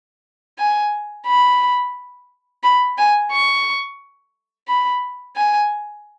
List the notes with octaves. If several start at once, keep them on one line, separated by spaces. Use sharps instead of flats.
G#5
B5
B5
G#5
C#6
B5
G#5